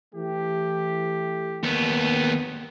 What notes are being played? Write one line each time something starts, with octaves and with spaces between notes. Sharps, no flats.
E3 A3 G4
D#2 B3